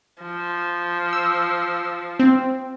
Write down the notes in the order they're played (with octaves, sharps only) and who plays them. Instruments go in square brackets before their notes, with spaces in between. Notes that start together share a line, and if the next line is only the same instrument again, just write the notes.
[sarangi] F3
[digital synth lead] E6
C4